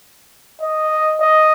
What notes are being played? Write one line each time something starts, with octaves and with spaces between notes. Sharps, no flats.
D#5
D#5